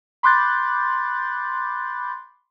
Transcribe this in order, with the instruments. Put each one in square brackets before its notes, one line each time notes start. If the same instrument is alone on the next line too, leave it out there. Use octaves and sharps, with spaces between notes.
[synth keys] B5 C6 D6 F#6 G6 A6